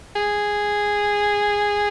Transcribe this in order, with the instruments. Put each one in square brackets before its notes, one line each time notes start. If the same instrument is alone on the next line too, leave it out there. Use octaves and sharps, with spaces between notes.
[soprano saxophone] G#4